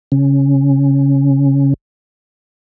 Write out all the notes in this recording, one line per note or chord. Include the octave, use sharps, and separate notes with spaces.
C#3 C#4